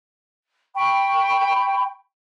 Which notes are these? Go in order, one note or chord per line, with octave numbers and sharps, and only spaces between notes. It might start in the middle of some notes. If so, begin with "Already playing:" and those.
G5 B5 C#6